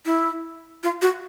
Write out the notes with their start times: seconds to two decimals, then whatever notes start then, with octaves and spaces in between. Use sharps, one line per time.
0.06 E4
0.84 F4
1.02 F#4